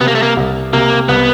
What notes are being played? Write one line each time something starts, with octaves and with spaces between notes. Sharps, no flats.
C3 B3
A#3
A3
A#3
C2
C3 A#3
C2 B3